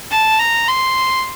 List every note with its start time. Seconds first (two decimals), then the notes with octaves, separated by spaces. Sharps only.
0.11 A5
0.39 A#5
0.68 C6